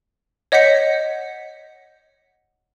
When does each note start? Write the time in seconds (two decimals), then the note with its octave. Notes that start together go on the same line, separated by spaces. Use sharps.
0.52 C#5 D#5 F#5 G6 B6 C#7